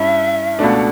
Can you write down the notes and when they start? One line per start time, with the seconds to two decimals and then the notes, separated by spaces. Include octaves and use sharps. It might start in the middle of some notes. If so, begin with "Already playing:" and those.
Already playing: G2 C#4 E4 E5
0.59 C#2 B2 A3 D4